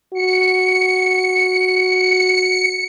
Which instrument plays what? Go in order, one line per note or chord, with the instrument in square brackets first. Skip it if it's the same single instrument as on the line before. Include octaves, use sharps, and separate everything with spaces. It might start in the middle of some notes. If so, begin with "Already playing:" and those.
[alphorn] F#4 [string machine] C#7